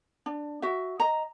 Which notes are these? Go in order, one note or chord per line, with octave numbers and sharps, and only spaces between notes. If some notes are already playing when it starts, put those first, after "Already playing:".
D4
F#4 E5
D#5 A#5